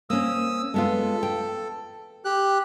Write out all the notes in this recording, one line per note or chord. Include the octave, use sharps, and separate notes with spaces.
A#3 C4 C#4 D#6 E6
G#3 B3 F4 A4
G5
G4 F#6